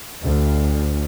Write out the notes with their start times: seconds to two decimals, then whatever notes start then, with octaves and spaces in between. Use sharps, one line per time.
0.22 D2